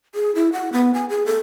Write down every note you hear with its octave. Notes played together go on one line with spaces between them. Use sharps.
G#4
E4
F#5
B3
G#5
G#4
A4